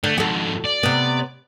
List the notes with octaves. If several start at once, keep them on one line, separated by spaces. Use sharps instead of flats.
D3 A3
F2 G#2 F#4 A4
D5
C3 B3